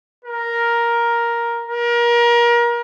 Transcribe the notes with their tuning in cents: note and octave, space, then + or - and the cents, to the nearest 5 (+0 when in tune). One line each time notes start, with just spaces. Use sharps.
A#4 +5
A#4 +30